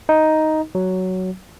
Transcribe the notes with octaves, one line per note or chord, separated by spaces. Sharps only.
D#4
F#3